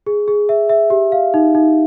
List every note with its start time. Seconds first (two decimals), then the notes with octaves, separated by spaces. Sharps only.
0.07 G#4
0.28 G#4
0.49 E5
0.69 E5
0.90 G4
1.12 F5
1.34 D#4
1.55 D#4